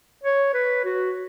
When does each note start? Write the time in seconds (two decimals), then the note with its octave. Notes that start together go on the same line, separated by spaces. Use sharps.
0.24 C#5
0.54 B4
0.85 F#4